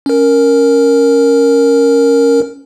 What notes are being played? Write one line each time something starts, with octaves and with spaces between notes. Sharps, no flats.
C#4 A#4